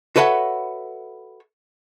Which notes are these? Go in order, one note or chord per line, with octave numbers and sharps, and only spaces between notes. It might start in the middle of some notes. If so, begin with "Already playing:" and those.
F#4 A4 B4 C#5 E5 F#5